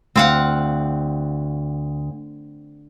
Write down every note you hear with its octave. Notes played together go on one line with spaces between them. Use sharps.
D2 C4 F5 F#5